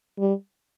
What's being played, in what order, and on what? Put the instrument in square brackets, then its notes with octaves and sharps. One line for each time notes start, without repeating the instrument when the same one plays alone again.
[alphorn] G3